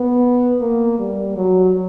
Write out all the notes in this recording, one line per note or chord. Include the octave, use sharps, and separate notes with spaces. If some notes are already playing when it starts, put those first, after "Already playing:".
Already playing: B3
A#3
G3
F#3